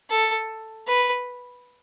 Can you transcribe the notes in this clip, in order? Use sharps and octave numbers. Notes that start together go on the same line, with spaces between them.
A4
B4